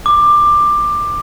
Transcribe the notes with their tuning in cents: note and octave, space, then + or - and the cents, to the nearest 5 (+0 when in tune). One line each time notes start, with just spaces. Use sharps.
D6 +15